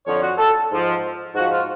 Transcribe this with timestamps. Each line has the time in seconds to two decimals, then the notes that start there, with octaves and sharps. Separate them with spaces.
0.07 F2 D3 F3 C#5
0.22 F#4
0.38 A4
0.71 G#2 F3
1.35 G#2 F3 F#4
1.52 F4